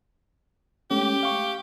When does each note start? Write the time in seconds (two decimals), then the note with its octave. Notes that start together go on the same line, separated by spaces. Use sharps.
0.91 G#3 A3 C#4 G4
1.23 F5 C#6